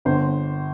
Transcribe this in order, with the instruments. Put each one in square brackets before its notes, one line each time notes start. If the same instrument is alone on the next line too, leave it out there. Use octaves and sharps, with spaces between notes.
[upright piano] G1 C5